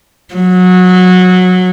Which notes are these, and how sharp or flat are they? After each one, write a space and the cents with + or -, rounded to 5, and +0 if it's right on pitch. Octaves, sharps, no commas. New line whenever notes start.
F#3 -20